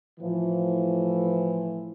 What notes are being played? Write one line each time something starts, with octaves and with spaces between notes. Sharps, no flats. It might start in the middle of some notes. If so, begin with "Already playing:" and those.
A2 E3 F3